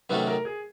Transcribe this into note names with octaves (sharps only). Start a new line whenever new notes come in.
C3 D#3 F#3 A3 C#4 B4
A#4
G#4